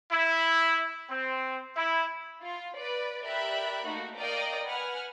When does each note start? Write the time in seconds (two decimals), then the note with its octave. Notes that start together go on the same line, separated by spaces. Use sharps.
0.11 E4
1.10 C4
1.76 E4
2.41 F4
2.77 B4 D5
3.24 G4 A#4 D5 E5 B5 F#6
3.85 A3 A#3 D#4 F#4
4.16 A#4 D5 D#5 F5 G5
4.65 B4 F#5 G#5 F6